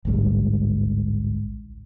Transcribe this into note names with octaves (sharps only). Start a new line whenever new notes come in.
A1 D2 G#2 G3